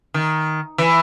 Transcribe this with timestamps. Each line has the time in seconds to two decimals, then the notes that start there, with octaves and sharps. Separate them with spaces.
0.14 D#3
0.78 E3